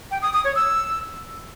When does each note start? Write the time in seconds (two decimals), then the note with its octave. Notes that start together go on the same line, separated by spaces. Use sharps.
0.11 G5
0.22 D#6
0.33 D#6
0.44 C#5
0.55 E6